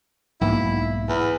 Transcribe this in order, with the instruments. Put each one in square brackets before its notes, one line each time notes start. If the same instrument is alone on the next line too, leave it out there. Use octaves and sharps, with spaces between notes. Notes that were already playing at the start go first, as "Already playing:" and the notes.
[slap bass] B1 G#2 A#3 [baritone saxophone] E4
[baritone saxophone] E2